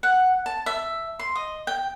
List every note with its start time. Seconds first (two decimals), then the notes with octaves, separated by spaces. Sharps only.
0.03 F#5
0.46 A5
0.66 E5
1.19 C6
1.36 D#5
1.67 G5